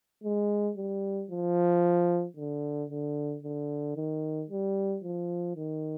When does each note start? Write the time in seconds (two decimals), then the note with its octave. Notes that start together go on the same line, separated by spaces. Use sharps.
0.24 G#3
0.77 G3
1.30 F3
2.37 D3
2.90 D3
3.43 D3
3.96 D#3
4.50 G3
5.03 F3
5.56 D#3